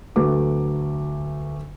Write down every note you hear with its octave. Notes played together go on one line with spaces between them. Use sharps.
D2 F#3 A3 B4 D6